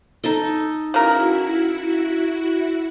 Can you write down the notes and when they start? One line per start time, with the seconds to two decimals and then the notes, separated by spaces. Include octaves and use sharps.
0.24 D#4 A4 D#5
0.94 C#3 E4 F#4 A#4